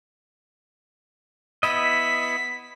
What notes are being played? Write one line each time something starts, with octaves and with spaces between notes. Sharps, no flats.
B3 E4 D#5 B6